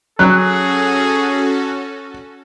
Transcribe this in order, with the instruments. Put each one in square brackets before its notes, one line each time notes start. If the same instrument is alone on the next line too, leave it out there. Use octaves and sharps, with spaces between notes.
[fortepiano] F#3 [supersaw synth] C#4 F#4 A4 [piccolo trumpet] G#4 [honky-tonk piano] F#6